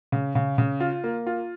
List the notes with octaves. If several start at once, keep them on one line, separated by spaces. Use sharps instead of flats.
C#3
C#3
C#3
F4
A#3
F4